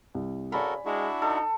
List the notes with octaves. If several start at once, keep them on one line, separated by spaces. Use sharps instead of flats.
C2
C#3 F#4 A4 A#4 D5 G#5 B5
G#3 D4 E4 F#4
D#4 A4